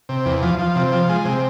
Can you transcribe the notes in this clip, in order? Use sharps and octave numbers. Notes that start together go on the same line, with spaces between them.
C3
E2
F3
F3
C3
F3
G#3
C3